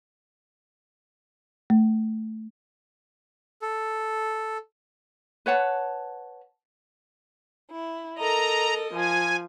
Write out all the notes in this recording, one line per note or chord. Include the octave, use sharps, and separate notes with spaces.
A3
A4
B4 C#5 F#5 A5
E4
A4 A#4 D#5 A#5
F3 G#5